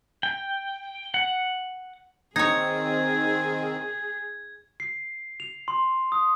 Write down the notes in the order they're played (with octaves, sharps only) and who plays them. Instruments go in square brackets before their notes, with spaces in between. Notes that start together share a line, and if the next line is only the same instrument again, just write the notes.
[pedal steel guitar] G5
F#5
[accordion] D#3 C4 [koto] D#4 C#5 [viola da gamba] G#4 [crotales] G#6
[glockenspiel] C7
F7
C6
D#6